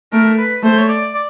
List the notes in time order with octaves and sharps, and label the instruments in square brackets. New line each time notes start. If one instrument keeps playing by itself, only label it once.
[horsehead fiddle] A3 [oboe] A#4
[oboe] B4
[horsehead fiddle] A3 [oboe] C5
[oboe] C#5
D5
D5